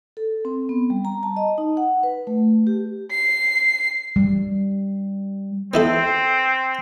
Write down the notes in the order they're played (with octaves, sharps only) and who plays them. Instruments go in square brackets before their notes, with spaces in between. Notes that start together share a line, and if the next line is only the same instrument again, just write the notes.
[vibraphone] A4
C4
B3
G3
A#5
A5
D#5
D#4
F#5
B4
A3
G4
[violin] C7
[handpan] G3
[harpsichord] B3 E4 A4 [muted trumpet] C4